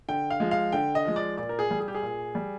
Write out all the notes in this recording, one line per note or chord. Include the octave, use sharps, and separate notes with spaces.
D3 G5
F5
F3 G#3
F5
D3 G5
D#5
F3 G#3
D5
A#2 D5
A#4
G#4
G3
G#4
G4
G#4
A#2
G3